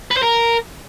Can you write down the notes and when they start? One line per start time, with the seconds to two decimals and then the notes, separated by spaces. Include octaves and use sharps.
0.11 B4
0.17 C5
0.23 A#4